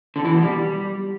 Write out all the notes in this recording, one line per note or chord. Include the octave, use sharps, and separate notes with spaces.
D3
E3
B2
G3